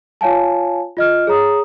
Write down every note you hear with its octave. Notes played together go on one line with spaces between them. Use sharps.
F4 C#5 F5 G#5 A5
F4 D#5 F6
G#4 C#5 A#5 D#6